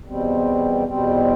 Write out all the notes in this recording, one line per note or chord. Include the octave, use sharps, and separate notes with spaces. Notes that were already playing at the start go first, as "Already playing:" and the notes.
E2 B2 G3 C4
E2 B2 G3 C4